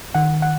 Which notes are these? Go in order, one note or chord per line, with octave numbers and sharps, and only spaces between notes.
D#3 F#5
F#5